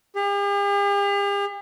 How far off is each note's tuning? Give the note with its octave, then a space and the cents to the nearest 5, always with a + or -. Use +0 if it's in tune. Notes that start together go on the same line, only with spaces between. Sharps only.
G4 +45